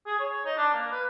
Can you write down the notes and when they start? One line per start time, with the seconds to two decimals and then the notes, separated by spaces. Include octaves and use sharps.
0.07 G#4
0.19 C#5
0.45 D#4
0.57 D4
0.73 A#3
0.91 B4